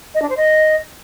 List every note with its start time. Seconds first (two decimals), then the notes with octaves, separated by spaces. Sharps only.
0.15 D#5
0.22 D4
0.30 C5
0.37 D#5